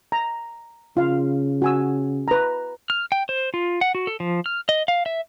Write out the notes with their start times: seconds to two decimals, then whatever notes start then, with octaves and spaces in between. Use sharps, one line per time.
0.12 A#5
0.97 C#3 F4 F5
1.62 F#4 G#5 E6
2.28 B4 A#5
2.90 F6
3.12 G5
3.29 C5
3.54 F4
3.81 F#5
3.95 F#4
4.07 A4
4.20 F3
4.46 F6
4.69 D#5
4.88 F5
5.06 E5